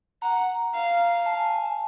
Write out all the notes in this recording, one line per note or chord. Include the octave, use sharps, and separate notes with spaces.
F#5 A#5
F5
A5
G#5
G#5
A5